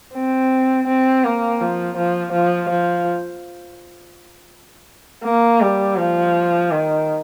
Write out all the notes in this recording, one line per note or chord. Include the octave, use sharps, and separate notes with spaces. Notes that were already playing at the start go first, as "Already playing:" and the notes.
C4
C4
A#3
F3
F3
F3
F3
A#3
G3
F3
D#3